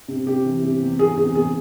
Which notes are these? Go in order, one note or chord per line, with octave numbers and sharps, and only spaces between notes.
C3
C3 G4
E3
C3
E2
E2 G#4
C3 G#4
E2 G#4